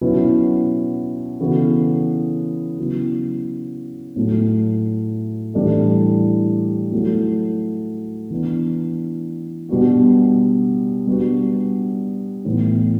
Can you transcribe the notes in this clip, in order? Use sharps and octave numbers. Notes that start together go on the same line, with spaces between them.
B2 F#3 C#4 E4 B4
C#3 E3 B3 F#4 A4
C#3 F#3 B3 E4
A2 F#3 A3
A2 E3 G3 D4 A4
F#3 A3 E4 A4
E3 B3 D4
B2 G3 B3 D4 F#4
G3 B3 D4 F#4
A2 E3 B3